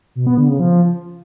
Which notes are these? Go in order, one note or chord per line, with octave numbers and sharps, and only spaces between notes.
B2
B3
D3
C#3
F3